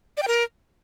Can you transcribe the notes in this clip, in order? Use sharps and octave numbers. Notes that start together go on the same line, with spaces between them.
D5
G5
A#4